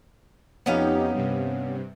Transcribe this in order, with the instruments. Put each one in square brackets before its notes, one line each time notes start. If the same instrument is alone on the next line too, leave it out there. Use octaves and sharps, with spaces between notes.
[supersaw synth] F2 D#4 G4 [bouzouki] B3 C#4 F5
[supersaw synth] G2 C3